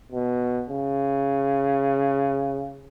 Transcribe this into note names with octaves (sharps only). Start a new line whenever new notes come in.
B2
C#3